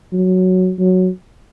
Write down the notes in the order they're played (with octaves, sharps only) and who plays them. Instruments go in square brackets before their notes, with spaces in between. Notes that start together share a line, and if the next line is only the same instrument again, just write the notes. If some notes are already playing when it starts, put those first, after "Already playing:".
[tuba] F#3
F#3